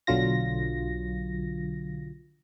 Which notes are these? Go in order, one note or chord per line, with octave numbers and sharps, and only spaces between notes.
B1 D3 F#3 F4 A#6